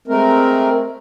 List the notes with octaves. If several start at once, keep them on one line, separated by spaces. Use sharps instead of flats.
G#3 A3 C4 A#4